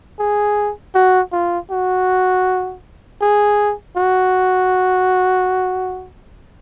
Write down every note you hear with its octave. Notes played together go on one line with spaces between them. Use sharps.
G#4
F#4
F4
F#4
G#4
F#4